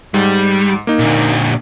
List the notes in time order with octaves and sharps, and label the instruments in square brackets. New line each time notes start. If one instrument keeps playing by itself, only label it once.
[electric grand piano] G#2 [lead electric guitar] G3
[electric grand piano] A#3 D#4
[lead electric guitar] A#2 D3